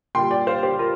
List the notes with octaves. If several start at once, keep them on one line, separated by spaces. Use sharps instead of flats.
A#2 G3 G5 C6
D5 G5
C5 F5
G4 C5
F4 A#4